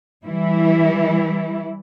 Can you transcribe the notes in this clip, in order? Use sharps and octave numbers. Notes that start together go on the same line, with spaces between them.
E3 G3 E4